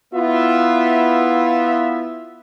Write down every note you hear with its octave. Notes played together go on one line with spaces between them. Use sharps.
B3 E4 F4 E5